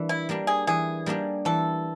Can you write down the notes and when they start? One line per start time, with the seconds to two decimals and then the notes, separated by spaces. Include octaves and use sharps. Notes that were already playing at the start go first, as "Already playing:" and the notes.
Already playing: E3 G3 A#3 D4
0.09 E4
0.29 G3 A#3 D4 G4
0.47 G#4
0.67 E3 G#4
1.06 G3 A#3 D4 G4
1.45 E3 A4